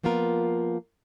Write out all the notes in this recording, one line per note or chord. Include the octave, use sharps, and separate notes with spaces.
F3 A#3 B3 F4 A#4